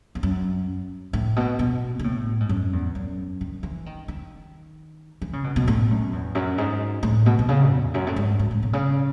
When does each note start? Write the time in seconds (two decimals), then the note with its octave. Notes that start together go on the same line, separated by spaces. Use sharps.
0.15 E2
0.23 F#2
1.13 A2
1.36 B2
1.59 B2
1.99 B2
2.04 A2
2.40 G#2
2.49 F#2
2.73 E2
2.95 F#2
3.41 D#3
3.63 E3
3.86 D#3
4.08 D#3
5.22 E3
5.33 C#3
5.44 B2
5.56 B2
5.67 A2
5.90 F#2
6.13 E2
6.35 F#2
6.58 G#2
7.03 A2
7.26 B2
7.39 B2
7.49 C#3
7.72 E2
7.94 F#2
8.07 A2
8.16 G#2
8.39 G#2
8.51 A2
8.63 B2
8.73 C#3